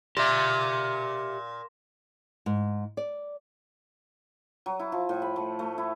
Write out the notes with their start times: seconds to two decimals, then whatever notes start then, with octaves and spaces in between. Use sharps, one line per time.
0.17 A#2 G4 E5 C6 A#6 E7
2.46 G#2
2.97 D5
4.66 F#3
4.79 E4
4.92 F3
5.09 A2
5.22 B5
5.36 A3
5.59 A3
5.78 E4